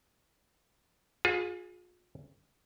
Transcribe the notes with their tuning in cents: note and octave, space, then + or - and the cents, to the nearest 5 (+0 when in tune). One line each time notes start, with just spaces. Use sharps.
F4 +35 G#4 +0 B4 +0